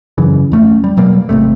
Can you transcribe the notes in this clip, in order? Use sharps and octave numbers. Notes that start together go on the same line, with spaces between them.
F#2 C#3 E3
F2 A3 C#4
G3
B2 F#3 G3 A#3
G#1 F2 C3 A3